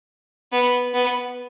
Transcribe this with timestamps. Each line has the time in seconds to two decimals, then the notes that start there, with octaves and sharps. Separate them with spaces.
0.52 B3
0.94 B3